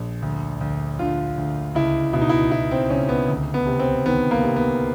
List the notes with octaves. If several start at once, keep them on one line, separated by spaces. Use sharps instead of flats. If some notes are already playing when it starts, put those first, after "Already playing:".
Already playing: A#1
D2
D2
D3 F4
D2
C#2 E4
B2 E4
D#4
E4
B2 E4
C4
C#2 C#4
B3
D2
B3
C3
C4
D#3 B3
A#3
C3
B3